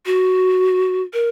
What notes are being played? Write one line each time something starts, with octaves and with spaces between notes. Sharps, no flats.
F#4
A#4